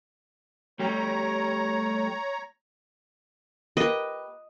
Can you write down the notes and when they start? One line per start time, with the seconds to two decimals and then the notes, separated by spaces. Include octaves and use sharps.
0.79 G3 A3 G4 C#5 A#5
3.77 A#3 G4 B4 D#5